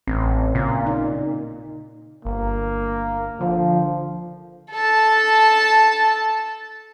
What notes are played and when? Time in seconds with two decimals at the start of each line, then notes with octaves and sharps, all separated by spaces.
0.07 A1 C4
0.55 A#2 C#3
0.87 D#4
2.25 G1 A#3
3.41 D3 F3
4.72 A4 A5